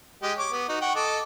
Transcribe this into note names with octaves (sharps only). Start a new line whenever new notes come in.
G#3 G4 D#5
C#5 D6
B3
D#4 F#4
F#5 G5 C#6
A4 D#5 D6